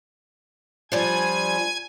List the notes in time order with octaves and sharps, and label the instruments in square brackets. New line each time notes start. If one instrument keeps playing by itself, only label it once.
[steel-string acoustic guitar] F3 G3 D4 [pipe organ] G#5 G#6